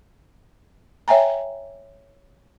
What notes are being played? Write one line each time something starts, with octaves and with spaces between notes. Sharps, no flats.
C#5 E5 G5 G#5 A#5